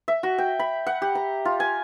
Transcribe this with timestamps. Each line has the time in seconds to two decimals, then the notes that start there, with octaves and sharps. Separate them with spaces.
0.08 E5
0.23 F#4
0.38 G5
0.59 B5
0.87 F#5
1.02 G4
1.15 A#5
1.45 F4
1.60 G#5